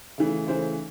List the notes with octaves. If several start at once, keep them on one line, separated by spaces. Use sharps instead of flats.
C#3 E3 A3
C#3 E3 A3 C5